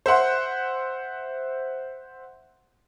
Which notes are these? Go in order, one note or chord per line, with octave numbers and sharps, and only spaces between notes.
C5 E5 F#5 C6